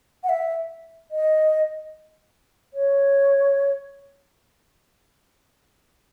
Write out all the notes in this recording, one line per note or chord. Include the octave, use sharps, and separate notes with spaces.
F#5
E5
D#5
C#5